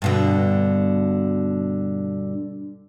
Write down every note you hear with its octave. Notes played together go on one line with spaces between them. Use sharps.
G2 B2 D3